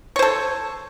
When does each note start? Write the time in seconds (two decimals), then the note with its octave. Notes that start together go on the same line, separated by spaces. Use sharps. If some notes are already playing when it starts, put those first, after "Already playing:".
0.16 C#5
0.19 C5
0.22 A4